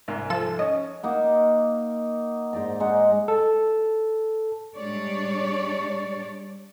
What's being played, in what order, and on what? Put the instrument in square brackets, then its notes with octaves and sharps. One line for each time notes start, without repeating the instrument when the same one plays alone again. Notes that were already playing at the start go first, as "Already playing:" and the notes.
[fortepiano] C2 G#2
[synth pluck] F3 A4 E7
[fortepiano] C#4 [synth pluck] D#5
[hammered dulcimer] A#3 D#4 F#5
G#2 C5 D5 A#5
G#3 D#4 F#5
[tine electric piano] A4
[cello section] G3 G#3 D4 C#5 D5